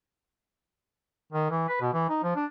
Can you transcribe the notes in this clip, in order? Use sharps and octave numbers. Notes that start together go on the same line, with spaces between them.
D#3
E3
B4
B2
E3
D#4
F3
D4